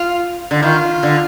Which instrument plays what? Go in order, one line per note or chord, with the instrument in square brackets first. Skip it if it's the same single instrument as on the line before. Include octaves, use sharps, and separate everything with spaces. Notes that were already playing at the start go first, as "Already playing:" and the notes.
Already playing: [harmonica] F4
[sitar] D3
[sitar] D#3 [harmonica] F4
[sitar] D3